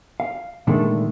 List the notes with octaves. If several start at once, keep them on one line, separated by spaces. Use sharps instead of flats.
F5
A#2 D3 D#3 G#3 A3